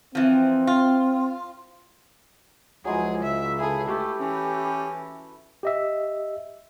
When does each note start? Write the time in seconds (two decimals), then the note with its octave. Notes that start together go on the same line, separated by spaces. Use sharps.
0.15 E3 F3 C4
0.67 F4
2.85 C#2 F3 F#3 G#3 E4 G#4
3.23 C#3 E5
3.60 E4 G#4 A4 B4
3.88 A3 G4
4.20 E3 C#4
5.63 G4 D#5 E5